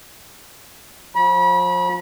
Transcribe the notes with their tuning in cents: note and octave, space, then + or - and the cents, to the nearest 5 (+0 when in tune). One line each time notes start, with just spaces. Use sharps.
F3 +30 B5 -35